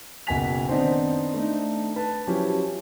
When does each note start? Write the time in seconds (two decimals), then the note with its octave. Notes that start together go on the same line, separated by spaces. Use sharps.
0.27 F#1 B2 F#5 G#5 B6 F7
0.69 D#3 B3 C4 D4 D#4 C5
1.34 A3 D4 D#4
1.96 B4 A5
2.27 F3 F#3 C#4 E4 G4